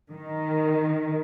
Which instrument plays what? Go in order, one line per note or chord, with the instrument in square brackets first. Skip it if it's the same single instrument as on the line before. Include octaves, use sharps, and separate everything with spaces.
[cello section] D#3